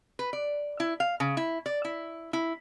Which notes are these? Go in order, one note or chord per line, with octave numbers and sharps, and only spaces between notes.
B4
D5
E4
F5
C#3
E4
D5
E4
E4